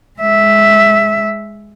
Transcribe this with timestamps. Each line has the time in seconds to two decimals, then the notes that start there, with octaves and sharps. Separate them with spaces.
0.20 G#3 E5